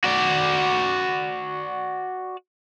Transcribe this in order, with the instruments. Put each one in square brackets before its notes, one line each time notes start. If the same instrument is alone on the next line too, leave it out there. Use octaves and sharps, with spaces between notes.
[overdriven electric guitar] F#4 D5